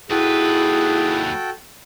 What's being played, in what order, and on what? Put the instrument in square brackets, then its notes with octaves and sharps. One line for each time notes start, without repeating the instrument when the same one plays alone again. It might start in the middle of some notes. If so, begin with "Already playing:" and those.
[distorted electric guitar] D#2 B4 [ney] E4 [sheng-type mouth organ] F#4 A4 G5 [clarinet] G#4